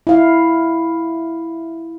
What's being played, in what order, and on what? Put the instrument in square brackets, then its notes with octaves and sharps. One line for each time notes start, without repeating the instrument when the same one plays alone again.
[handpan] E4 F5